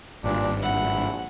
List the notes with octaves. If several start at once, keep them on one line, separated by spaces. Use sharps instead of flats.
G#1 G2 A#2 D4
A#1 E4 F#5